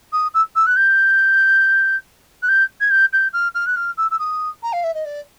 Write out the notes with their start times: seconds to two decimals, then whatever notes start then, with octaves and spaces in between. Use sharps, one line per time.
0.12 D#6
0.34 E6
0.55 E6
0.66 F#6
0.76 G6
2.42 F#6
2.48 G6
2.80 G#6
2.90 G6
3.13 G6
3.33 F6
3.55 F6
3.66 F#6
3.76 F6
3.97 E6
4.11 E6
4.19 D#6
4.63 A#5
4.73 F5
4.84 E5
4.94 D#5
5.05 D5